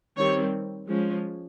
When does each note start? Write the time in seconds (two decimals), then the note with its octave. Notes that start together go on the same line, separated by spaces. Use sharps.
0.17 D#3 G3 C4 C#5
0.89 F3 G#3 C#4